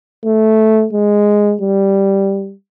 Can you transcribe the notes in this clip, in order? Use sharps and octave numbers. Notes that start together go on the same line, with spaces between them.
A3
G#3
G3